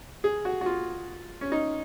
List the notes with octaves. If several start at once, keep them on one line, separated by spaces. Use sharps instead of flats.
G#4
F#4
F#4
F4
C#4
D#4